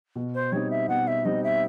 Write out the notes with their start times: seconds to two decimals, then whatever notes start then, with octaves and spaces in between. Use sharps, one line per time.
0.16 B2
0.34 C5
0.52 G3 C4 D#4 C#5
0.70 E5
0.88 B2 F#5
1.07 E5
1.25 G3 C4 D#4 D#5
1.43 E5